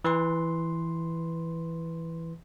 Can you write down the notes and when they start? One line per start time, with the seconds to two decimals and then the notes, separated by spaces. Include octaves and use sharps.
0.04 E3 B4 C6